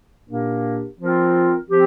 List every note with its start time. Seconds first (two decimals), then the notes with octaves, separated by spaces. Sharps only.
0.29 A#2 A#3 D4 G4 A#4
0.99 F3 C4 F4 A#4
1.70 F3 C4 G4